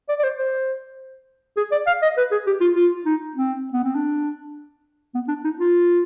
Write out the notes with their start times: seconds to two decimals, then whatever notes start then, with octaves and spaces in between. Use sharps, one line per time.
0.09 D5
0.19 D5
0.24 C5
0.38 C5
1.57 G#4
1.72 D5
1.87 F5
2.02 D#5
2.17 B4
2.32 G#4
2.47 G4
2.61 F4
2.76 F4
3.06 D#4
3.36 C4
3.73 B3
3.84 C4
3.95 D4
5.15 B3
5.28 D4
5.44 D#4
5.59 F4